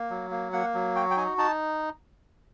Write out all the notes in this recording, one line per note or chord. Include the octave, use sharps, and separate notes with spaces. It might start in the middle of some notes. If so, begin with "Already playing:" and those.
Already playing: A#3
F#3
A#3
A#3 F#5
F#3
F#4 G5
G5
D#4 G#5
D#4 A5